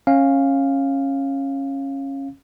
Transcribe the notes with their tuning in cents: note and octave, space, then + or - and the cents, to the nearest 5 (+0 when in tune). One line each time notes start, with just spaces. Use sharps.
C#4 -20 F5 +0